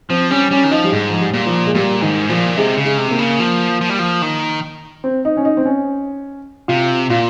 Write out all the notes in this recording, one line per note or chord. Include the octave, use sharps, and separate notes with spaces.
F3 C4
G3 C#4
G3 C#4
D#3
F3 D#4
G3
G#2 G#3
F3
G3
A#2
F3
G#3
A#2 G3
G#2 D#3
A#2 F3
C3 G#3
C#3
G#3
C3
A#3
C#3
F3
F3
G3
F3
D#3
C4
D#4
C#4
D#4
C4
C#4
C3 F4
A#2 F4